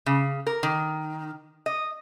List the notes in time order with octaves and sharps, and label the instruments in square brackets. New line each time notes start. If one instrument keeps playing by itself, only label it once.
[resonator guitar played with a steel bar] C#3
A#4
D#3
D#5